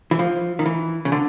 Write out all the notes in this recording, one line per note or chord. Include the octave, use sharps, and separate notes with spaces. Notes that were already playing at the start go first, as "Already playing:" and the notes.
E3
F3
D#3
E3
C#3
D3